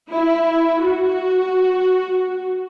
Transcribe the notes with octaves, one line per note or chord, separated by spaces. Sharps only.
E4
F#4